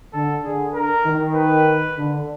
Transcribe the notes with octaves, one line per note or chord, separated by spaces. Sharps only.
D3 A4
D3 G#4
A#4
D#3
B4
D3